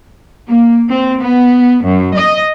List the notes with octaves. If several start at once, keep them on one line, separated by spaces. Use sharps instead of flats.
A#3
C4
B3
F#2
D#5